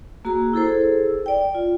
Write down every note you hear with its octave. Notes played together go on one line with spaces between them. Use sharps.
A#3 F#4 G#4 A#5
E4 G#4 A4 C5
D5 G5
F4